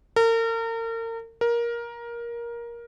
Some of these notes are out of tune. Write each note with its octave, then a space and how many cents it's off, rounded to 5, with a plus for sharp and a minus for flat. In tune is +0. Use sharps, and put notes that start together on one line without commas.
A#4 -35
A#4 +15